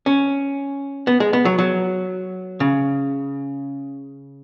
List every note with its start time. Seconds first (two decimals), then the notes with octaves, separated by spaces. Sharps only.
0.06 C#4
1.07 B3
1.20 G#3
1.33 B3
1.45 F#3
1.58 F#3
2.60 C#3